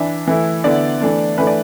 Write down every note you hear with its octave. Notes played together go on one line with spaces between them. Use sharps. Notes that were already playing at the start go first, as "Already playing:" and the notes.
Already playing: E3 D4 E5
E3 A3 E4
D3 B3 E4 D5
E3 A3 D4
E3 A3 D4 B4
D5